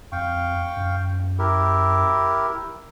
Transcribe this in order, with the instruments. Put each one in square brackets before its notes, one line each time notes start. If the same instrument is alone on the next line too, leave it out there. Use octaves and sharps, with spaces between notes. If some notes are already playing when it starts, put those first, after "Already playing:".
[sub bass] F2 [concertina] F5 G5 C#6
[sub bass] F#2
[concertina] E4 G4 A#4